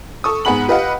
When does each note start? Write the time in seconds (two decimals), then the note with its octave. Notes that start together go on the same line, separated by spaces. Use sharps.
0.24 A4 C#6 D#6
0.45 G#2 B3 G#4 F#5 B5 F#7
0.68 G4 B4 D#5 F5 F#5